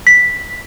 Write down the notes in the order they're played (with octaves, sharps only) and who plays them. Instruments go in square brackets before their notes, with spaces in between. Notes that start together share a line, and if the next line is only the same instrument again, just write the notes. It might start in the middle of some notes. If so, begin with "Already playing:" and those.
[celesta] B6